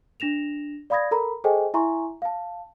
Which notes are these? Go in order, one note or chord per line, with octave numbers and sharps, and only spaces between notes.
D4 A#6 E7 F7
D5 F5 B5 D#6 G#6 A#6
A4 A#4 A#5 B5
G#4 A4 C5 D#5 G5 G#5
E4 E5 G#5 A#5 C6 C#6
F5 A5